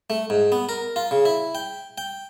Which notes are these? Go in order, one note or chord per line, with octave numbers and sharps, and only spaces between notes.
A3
G#2
B3
A#4
F4
C#3
E4
G5
G5